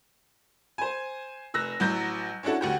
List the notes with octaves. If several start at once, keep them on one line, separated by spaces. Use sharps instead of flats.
C5 G#5
F1 E6 F#6 A#6
A1 F#3 G6 A#6
C#4 D4 E4 F#4 A4
D2 F#4 G4